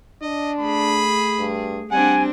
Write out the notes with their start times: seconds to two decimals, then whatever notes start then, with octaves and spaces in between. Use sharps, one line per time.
0.22 D4 D#5
0.59 A3 G#4 B5
1.39 G2
1.91 G3 C4 D4 F#5 G#5